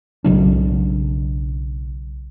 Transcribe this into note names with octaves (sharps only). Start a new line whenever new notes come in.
B1 C#3 F#3 D4